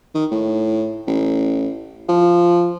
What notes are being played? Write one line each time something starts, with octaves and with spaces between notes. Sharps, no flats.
D#3
A2
A1
F3